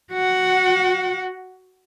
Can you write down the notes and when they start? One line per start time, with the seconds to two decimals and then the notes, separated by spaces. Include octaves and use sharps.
0.12 F#4 F#5